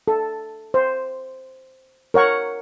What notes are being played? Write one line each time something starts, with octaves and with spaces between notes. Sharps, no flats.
A4
C5
A#4 C#5 F#5 C#6